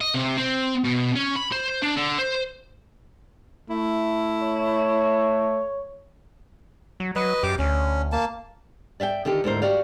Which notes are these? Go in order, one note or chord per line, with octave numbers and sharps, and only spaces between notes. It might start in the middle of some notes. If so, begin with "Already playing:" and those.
D#5
C3
C4
B2
C#4
B5
C5
D4
D3
C5
A3 E4
C#5
F#3
F#3 B4 D#5
F#2 G4 D6
D2 C#4
A#3 A5
D5 E5 F5 G5
D3 D#3 F4 G4
D2 G#2 E4 A#4 C5
F#4 G4 D5 F5